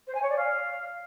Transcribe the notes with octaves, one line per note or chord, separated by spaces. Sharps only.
C5
G#5
C#5
D5
F5